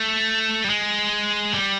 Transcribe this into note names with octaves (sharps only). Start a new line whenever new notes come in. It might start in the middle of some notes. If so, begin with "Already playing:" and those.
Already playing: A3
G3
G#3
G3